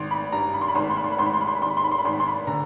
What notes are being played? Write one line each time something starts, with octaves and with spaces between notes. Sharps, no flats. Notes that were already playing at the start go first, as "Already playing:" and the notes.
Already playing: G#1 C6
B5
G2 A#5
B5
C6
B5
G#1 C6
B5
C6
B5
C6
B5
G#1 C6
B5
C6
B5
C6
B5
G#1 C6
B5
C6
B5
C6
B5
G#1 C6
B5
C6
B5
D3 A#5